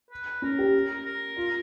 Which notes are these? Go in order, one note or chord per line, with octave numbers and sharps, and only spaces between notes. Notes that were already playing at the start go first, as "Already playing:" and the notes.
B4
C#4 A#4
G4
A#4
F4